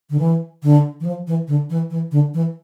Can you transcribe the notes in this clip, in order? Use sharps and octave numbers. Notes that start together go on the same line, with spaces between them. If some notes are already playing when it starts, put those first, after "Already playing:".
D3
E3
D3
E3
F3
E3
D3
E3
E3
D3
E3